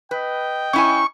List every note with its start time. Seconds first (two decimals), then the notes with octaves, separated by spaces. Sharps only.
0.11 B4 D#5 G5
0.73 C#4 E4 G#5 C#6